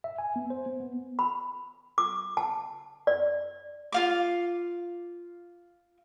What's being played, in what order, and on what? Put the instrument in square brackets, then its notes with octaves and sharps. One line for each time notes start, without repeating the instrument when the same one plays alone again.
[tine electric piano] E5
G#5
B3
C5
B3
B3
[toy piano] B5
D6
A5
D5
[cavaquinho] F4 F5 D6